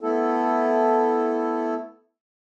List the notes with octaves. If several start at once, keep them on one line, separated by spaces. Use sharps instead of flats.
A3 B3 E4 A4